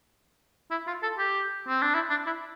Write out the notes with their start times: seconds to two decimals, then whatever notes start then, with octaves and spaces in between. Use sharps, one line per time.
0.71 E4
0.87 F4
1.03 A4
1.18 G4
1.68 C4
1.82 D4
1.94 E4
2.10 D4
2.26 E4